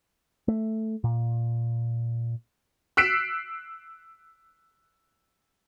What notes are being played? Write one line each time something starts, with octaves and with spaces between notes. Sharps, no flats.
A3
A#2
E6 F#6 B6 C7 D7 E7